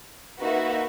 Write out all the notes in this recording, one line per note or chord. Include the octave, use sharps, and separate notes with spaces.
A#3 D#4 F#4 B4 E5